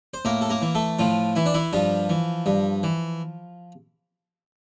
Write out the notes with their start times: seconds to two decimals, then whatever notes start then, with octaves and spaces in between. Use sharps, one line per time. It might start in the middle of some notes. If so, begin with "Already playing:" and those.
0.14 C5
0.25 A2 A#3 A#4
0.41 A4
0.50 A#3 A#4
0.62 E3
0.75 A3 A4
0.99 A2 F3 F4
1.36 E3 E4
1.46 D4
1.54 E3 E4
1.73 G2 F3 F4
2.10 E3
2.46 G2
2.83 E3